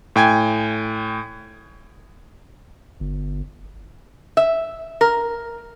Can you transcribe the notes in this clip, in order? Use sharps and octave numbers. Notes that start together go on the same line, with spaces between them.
A2 G5 G#5 G#6
G1
E5
A#4